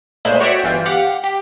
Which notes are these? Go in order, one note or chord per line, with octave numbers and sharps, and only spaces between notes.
B1 A#2 G#3 A3 C5 B5
F#4 C#5 D5 E5 F#5 G5
G1 E3 F4 G5
G4 F5 F#5
G4 B6